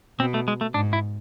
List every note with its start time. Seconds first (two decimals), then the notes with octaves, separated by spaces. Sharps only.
0.19 B2 C4
0.34 A3
0.48 G#3
0.61 A3
0.74 G#2 D4
0.93 E4